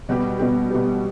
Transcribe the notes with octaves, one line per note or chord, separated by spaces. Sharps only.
B2 G3 B3 G4
B2 G3 B3 G4
B2 G3 B3 G4